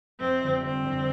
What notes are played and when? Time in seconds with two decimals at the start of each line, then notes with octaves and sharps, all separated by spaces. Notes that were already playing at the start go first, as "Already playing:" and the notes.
0.20 F1 C4
0.41 F2 D3 G3
0.62 F1 C4
0.84 F2 D3 G3